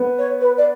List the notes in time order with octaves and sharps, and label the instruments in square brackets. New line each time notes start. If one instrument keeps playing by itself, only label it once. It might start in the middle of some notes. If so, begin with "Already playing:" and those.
Already playing: [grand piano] B3
[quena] C#5
B4
D5